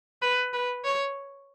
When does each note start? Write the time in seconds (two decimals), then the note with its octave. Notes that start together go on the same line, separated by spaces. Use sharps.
0.22 B4
0.53 B4
0.84 C#5